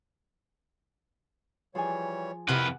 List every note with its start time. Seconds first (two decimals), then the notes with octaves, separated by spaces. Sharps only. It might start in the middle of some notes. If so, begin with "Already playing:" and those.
1.75 E3 F3 G3 G#4 C#5 G#5
2.49 F2 C3 E4 A#4 B4 F#5